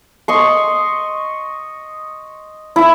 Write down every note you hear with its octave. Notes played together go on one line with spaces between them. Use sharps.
D#5 C6 C#6
E4 E6